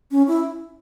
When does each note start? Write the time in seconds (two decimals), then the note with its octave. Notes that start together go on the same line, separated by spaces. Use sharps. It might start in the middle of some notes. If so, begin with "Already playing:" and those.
0.11 C#4
0.28 E4